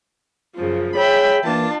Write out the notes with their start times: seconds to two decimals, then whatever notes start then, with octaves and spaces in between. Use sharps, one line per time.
0.56 F#2 C#3 F3
0.95 G#4 C#5 E5 G5 B5
1.43 E3 A#3 D4 F4 A5